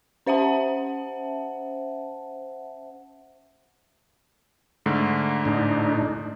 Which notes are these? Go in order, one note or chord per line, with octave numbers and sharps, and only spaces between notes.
C#4 C5 E5 F#5 A5
G#2 D3 A3
A2 D4 D#4